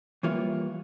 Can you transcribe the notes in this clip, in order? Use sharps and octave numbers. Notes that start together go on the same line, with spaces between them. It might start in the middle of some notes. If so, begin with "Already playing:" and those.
E3 G3 A#3 F4 B4 C#5